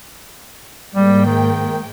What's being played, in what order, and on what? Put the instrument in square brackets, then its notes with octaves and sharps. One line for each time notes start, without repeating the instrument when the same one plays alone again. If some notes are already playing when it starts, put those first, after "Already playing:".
[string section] G#2 A#3 G5 [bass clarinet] G3
[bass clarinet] D#3